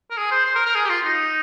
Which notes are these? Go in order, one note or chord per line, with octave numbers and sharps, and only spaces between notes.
A#4
G#4
C5
C5
A#4
A#4
G#4
G4
F4
D#4